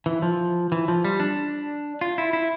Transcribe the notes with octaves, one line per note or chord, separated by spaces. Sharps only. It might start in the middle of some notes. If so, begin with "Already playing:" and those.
E3
F3
E3
F3
G3
D4
F4
E4
E4